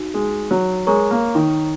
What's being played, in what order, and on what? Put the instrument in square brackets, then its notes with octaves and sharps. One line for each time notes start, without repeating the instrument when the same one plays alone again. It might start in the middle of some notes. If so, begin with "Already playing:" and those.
Already playing: [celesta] D#4 F#4
[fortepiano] G#3
F#3
[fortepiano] G#3 [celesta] A#4 C#5 A#5 C#6
[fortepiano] A#3
D#3